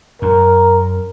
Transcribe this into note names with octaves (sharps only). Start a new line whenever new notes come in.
F#2 A#4